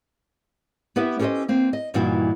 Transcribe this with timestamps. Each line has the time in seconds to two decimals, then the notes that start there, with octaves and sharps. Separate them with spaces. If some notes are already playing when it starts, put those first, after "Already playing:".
0.96 B3 E4 G4 B4 E5
1.19 C#4 G4 A4 B4 C5 D#5
1.49 A#3 C4
1.73 D#5
1.94 G2 A#2 E3 D#4 E4 F#4